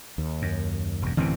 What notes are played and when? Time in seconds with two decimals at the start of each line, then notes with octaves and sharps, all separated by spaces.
0.18 D#2
0.42 F#2
1.02 E1 F#2
1.17 A1 F#2 B2 D3 E3 C4